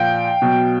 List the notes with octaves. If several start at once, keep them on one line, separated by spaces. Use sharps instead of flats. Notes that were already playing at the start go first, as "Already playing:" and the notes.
Already playing: A#2 F3 F5 G5
B2 F#3